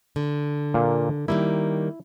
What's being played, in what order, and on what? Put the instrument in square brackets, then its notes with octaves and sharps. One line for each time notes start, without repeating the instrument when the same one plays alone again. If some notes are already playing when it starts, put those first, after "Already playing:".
[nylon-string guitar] D3
[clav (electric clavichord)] A#2 A#3
[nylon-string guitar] D#3 G3 A#3 [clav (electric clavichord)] E4